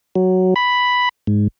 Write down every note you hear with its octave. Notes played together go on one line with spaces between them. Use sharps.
F#3
B5
G#2